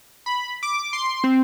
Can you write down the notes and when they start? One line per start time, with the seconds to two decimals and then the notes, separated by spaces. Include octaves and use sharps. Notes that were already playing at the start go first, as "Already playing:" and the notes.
0.26 B5
0.63 D6
0.93 C6
1.24 C4